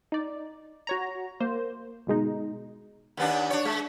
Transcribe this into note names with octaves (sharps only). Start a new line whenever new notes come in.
D#4 D5
F#4 C#5 A#5
A#3 C5
G1 B2 G#3 D#4
D#2 B3 D4
D4 C#5
G#3